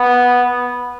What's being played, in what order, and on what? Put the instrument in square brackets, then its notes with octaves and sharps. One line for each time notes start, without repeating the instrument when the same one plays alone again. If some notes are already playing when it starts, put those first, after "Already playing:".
Already playing: [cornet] B3